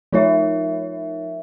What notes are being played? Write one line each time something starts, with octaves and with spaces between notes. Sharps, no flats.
F3 D#4 F4 A#4 C#5 E5